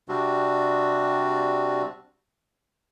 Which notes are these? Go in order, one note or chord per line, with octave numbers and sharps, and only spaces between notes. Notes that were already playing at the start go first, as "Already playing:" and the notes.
C3 G3 C4 D4 F#4